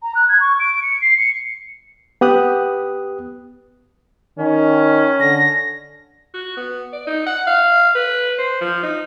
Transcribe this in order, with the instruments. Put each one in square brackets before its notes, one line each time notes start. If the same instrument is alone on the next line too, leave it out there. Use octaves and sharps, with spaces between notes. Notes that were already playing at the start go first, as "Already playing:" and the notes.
[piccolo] A#5
F#6
G#6
C#6
D7
C#7
C7
C#7
[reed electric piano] B3 G4 D#6 F#6
[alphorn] D#3 [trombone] C#4
[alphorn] D3 [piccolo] A#6
[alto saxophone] F#4
B3
D5
D#4
F#5
F5
B4
C5
F3
D#4